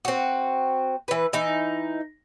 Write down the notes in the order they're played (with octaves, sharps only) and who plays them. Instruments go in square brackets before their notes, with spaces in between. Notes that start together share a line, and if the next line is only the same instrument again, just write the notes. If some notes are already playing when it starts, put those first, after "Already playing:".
[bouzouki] C4 F#4
E3 B4
E3 D#4